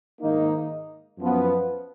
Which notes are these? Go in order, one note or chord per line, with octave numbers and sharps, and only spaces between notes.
G#2 D#3 A#3 D#4
F#2 F3 B3